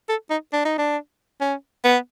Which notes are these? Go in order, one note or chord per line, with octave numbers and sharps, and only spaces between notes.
A4
D#4
D4
D#4
D4
C#4
B3